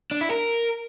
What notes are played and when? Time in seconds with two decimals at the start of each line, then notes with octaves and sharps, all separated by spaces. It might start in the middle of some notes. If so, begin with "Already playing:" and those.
0.11 D4
0.21 E4
0.31 A#4